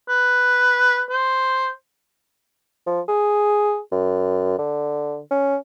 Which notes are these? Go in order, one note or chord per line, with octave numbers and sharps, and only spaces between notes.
B4
C5
F3
G#4
F#2
D3
C#4